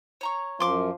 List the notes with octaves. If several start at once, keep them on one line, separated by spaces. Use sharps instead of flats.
C#5 A#5 C#6
F#2 F3 C6 D6